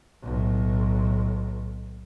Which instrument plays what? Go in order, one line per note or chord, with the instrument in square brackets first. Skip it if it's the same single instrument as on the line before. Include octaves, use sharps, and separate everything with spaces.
[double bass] B1 A2